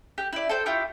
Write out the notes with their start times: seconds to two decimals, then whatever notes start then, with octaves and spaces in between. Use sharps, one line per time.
0.18 G4
0.33 E4 D5
0.49 A4 C5 G5
0.66 E4 F4 G4 C#5